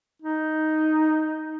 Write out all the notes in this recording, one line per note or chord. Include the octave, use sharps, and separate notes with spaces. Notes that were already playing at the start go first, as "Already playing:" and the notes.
D#4